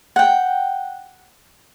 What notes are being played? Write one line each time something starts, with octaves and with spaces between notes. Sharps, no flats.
F#5 G5